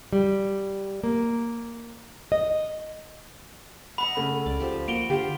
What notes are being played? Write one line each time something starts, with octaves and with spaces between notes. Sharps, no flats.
G3
A#3
D#5
D#5 E5 F#5 B5
C#3 A3
C#2 D5
F3 G4
A#3 F#4 D7 F7 G7
D3 F4 G4 C5